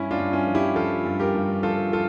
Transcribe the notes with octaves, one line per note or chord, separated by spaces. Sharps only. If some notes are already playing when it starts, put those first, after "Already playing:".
Already playing: G2 C#4 E4
D4 F4
G2
C#4 E4
F3
E4 G4
F3 F4 A4
G2
G4 A#4
G2
F3 F4 A4
F3 F4 A4